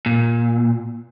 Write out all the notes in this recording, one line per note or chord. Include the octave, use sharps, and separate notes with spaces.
A#2